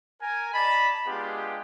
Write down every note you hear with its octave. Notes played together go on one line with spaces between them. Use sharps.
A#4 G#5
D5 D#5 A5 B5
G#3 B3 D4 F4 G4 G#4